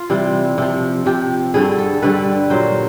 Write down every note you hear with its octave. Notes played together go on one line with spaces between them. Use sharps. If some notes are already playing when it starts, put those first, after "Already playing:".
Already playing: F4
C3 E3 G3
C3 F3
C3 F3 G4
G2 D3 G3 G#4
A4
G2 D3 G3 B4
A#2 F#3 C5